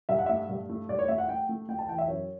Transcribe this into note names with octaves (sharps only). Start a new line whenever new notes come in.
G2 E5
F#5
A3 E5
G2
A3
G2 D5
C#5
A3 E5
F#5
A3 G5
A3
A3 G5
A5
E3 G5
E5
F#2 C#5